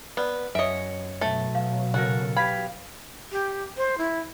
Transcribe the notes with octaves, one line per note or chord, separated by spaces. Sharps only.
B3 B4 D5
F#2 C#5 D#5 E5 D7
B2 F#3 A3
F5
C#3 F#4 A4 A#4
G4 B4 F5 B5 G#6 B6
G4
C5
E4